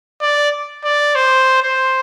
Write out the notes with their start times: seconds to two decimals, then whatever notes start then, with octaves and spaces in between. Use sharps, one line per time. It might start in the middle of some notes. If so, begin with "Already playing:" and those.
0.21 D5
0.84 D5
1.15 C5
1.62 C5